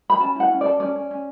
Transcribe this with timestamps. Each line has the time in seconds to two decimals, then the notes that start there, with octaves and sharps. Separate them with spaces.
0.10 B5
0.20 C#4 A5
0.35 E4 F#5
0.50 C#4
0.61 A4 D5
0.80 C#4 D5
0.96 C#4
1.11 C#4